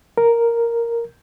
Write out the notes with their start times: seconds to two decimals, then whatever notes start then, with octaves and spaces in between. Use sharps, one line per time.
0.18 A#4